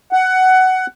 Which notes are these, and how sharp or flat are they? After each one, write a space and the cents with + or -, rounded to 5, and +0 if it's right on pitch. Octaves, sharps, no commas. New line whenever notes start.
F#5 +15